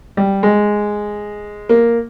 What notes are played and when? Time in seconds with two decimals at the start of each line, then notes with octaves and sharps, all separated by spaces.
0.17 G3
0.43 G#3
1.69 A#3